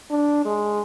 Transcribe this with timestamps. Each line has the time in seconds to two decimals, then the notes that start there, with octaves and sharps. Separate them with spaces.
0.11 D4
0.45 G#3